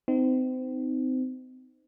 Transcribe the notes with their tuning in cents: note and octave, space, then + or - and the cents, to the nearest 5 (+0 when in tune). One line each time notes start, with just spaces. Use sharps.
C4 -30 D#4 +0